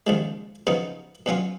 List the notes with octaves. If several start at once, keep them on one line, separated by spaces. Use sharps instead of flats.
D#2 C#3 F3 G#3
C#3 F3 B3 D#4
B2 F#3 C#4 F4